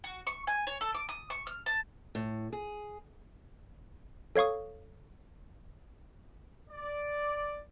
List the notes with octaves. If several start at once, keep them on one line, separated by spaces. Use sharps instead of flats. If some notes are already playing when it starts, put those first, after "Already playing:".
F#4
C#6
G#5
C#5
A4
D6
D#6
C#6
F6
A5
A2
G#4
A4 C#5 F5 C#6 D#6
D5